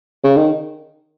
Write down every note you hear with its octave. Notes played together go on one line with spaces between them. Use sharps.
C#3
D#3